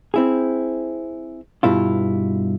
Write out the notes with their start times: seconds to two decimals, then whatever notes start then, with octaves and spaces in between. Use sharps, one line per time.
0.14 C4 E4 G#4
1.63 G2 B2 E4 F4